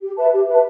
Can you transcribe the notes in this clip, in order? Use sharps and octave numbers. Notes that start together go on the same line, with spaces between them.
G4
B4 E5 A5
G4
B4 E5 A5